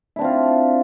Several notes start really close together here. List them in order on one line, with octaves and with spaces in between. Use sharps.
E4 D4 C4 F4